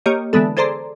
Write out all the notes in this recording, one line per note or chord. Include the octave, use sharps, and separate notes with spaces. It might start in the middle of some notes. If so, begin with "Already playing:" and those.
A#3 G4 C#5 D#5
D3 E3 G#3 B3 A4
G#4 A4 C5 D5 A#5 C6